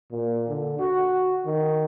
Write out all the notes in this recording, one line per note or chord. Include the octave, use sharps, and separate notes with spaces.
A#2
D3
F#4
D#3